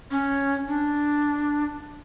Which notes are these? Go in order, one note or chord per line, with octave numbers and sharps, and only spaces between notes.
C#4
D4